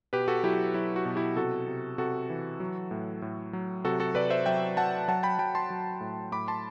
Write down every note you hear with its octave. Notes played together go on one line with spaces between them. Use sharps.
B2 G4 B4
F#4 A4
F#3 E4 G4
F#3 E4
F#4
B2
E4 G4
C3 F#4 A4
C3
C3 F#4 A4
E3
F#3
A2
A2
F#3
C3 F#4 A4
F#4 A4
C3 B4 D5
C5 E5
F#3 E5 G5
F#3 F#5 A5
F#3 F#5 A5
G5 B5
F#3 G5 B5
A5 C6
F#3
A2
A2 B5 D6
A5 C6